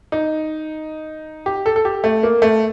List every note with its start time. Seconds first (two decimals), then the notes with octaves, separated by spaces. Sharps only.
0.12 D#4
1.46 G4
1.66 A4
1.76 A4
1.85 G4
2.04 A3
2.23 A#3
2.42 A3